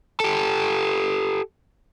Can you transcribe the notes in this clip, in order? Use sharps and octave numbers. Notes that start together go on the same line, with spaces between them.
G4 A4